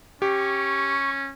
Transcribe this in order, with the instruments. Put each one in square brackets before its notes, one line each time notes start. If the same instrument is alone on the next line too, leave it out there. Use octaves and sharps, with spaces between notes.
[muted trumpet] C#4 [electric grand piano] G4 [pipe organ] C#6